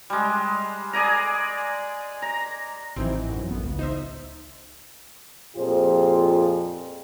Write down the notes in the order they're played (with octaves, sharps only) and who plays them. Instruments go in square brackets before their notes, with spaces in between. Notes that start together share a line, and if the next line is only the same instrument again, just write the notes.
[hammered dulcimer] G3 G#3
G#4 D5 G#5 A#5
A#5
[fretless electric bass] A1 E3 [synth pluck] C4 D#4 E4
[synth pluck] F#2
[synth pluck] A1 [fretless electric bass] B3
[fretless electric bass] C#2
[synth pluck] D#4 C5 E5
[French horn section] F2 A#2 F4 G4 G#4 C5